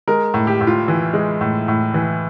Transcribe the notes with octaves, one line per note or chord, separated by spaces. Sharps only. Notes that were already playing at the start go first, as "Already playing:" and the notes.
G#3 A#4
A2
G4
A2
F4
E3
G#3
A2
A2
E3